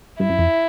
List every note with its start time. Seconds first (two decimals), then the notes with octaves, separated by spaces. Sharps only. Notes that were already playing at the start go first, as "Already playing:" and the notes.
0.20 G2 E4
0.29 F#2
0.39 F2